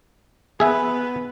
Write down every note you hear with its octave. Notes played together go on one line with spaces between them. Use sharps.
B3 G#4 B4 E5 G#5